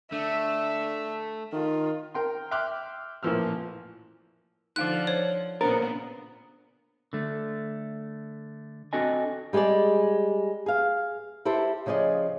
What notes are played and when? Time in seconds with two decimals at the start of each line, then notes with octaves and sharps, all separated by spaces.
0.12 D3 A3 E5
1.52 D#3 F4
2.14 A#4 G5 C6
2.51 E5 G5 C6 D6 F6 F#6
3.23 A1 A#2 E3 F3 E6 F6
4.76 D3 F3 D#4 F5 D6 F#6
5.07 C5 C#5
5.61 A#2 C#3 B3 D4 A#4 C5
7.13 D3 A3
8.93 C4 D4 F#4 A4 D#5 G#5
9.53 G3 G#3 G4 G#4 D5
10.66 G#4 F5
11.45 E4 G4 A4 C5
11.86 C#3 F3 G#4 D5 D#5